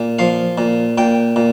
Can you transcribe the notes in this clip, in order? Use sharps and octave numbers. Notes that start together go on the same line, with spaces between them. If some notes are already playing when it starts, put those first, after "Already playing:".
Already playing: A#2
F3 F5
A#2
A#2 G5
A#2